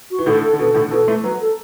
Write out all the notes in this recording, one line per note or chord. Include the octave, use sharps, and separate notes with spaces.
F#4
E3
A2 D3 A4
A4
D3
B2 A4
A2 D3
B2 E3 A4
E3 A3
F#3 B3 B4
A4